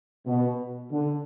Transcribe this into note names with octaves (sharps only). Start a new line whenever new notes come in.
B2
D3